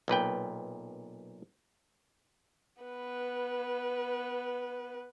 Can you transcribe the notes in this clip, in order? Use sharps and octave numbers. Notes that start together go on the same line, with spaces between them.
B1 A#2 B4 G5
B3 B4